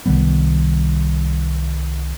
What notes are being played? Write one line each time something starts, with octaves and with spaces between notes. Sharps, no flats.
C2 D#3 G3 B3